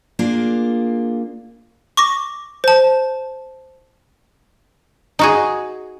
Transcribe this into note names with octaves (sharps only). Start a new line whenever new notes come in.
A#3 D4 F4 G#4
C#6 D6 A#6
C5 A5
D#4 F#4 G#4